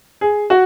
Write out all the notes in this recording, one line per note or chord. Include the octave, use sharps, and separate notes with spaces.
G#4
F#4